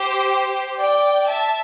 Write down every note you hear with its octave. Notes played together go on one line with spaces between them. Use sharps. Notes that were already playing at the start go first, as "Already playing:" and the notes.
Already playing: G4 C5
D5 G5
E5 A5